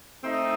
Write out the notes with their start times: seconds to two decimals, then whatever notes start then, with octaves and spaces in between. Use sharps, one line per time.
0.23 A3 C4 D#4